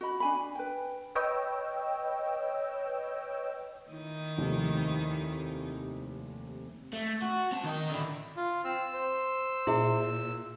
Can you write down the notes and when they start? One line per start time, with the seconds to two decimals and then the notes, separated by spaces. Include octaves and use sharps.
0.01 F#4 D#5 B5
0.20 D4 G#5 B5
0.55 B4 G5
1.15 B4 C#5 D#5 G5 E6
3.91 D#3 D#4 E4
4.38 F1 D#2 C3
6.93 A3
7.22 F#4
7.52 C4 A5
7.64 D#3 D#5
7.90 D3 E4
8.36 F4
8.65 C4 E6
8.94 C5
9.67 A#2 E4 G#4 E5